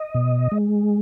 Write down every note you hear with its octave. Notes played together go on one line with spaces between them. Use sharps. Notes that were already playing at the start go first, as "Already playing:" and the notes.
Already playing: D#5
B2
G#3